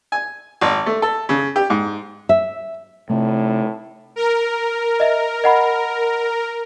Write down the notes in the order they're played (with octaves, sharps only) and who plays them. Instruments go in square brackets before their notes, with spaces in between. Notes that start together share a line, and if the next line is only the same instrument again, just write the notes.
[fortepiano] G#5
G#1
A3
A4
C#3
G4
G#2
[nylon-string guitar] E5
[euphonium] A2 [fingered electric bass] C3 A3
[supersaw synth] A#4
[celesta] D#5 E5
D#5 F#5 B5